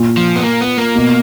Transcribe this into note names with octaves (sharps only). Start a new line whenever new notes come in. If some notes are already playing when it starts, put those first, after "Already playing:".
Already playing: A#2
F3
B3
A#3
B3
A#3
B2